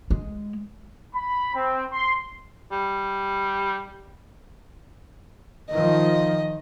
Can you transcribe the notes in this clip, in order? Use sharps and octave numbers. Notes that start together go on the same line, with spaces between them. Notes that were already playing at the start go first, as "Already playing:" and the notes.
G#3
B5
C4
C6
G3
D#3 F3 D#5